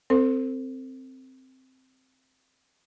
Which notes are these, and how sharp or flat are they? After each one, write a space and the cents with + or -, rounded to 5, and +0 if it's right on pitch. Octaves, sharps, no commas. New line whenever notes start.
C4 +0 A4 +35 C5 +0